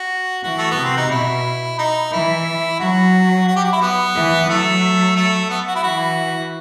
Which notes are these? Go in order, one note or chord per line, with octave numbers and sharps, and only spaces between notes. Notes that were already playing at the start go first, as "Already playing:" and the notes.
Already playing: F#4
E3 F#4
A3
B3
C3
C4
D#4
B2 E4
D#4
E3 E4
F#3 F#4
F#4
G4
F#4
E4
B3
E3
F#3 A3
A3
B3
F#4
E4
E3 F#4